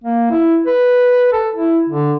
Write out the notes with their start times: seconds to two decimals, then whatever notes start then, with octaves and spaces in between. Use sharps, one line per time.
0.04 A#3
0.31 E4
0.66 B4
1.32 A4
1.56 E4
1.89 D3